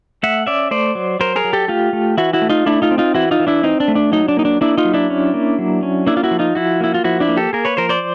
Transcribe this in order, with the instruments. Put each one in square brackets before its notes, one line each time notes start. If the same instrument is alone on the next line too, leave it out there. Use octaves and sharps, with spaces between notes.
[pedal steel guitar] A3 E5 F#5
C#4 D5 E5
A3 C5 D5
F#3
F#3 A#4 C5
G#4 A#4
F#3
G4 A4
A3 F4 G4
A3
E3 E4 F#4
E4 F#4
A3
D#4 F4
A3 D4 E4
D#4 F4
C4
D#4 F4
E3 E4 F#4
D#4 F4
E3
D4 E4
C4 D#4
D4
A3
D4
F#3 D#4
D4
A#3 D#4
D4
A#3 D4 E4
D#4 F4
F#3
D4 E4
C#4
A#3
F#3
C#4
A#3 D4 E4
F4
E4 F#4
F3
D#4 F4
F3 E4 F#4
A#3 E4
F4
F3 E4 F#4
D4 E4
A#3
G4 A4
A#3 G#4 A#4
B4 C#5
F3 A#4 C5
C5 D5